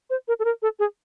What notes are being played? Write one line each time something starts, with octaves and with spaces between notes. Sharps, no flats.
C5
A#4
A4
A#4
A4
G#4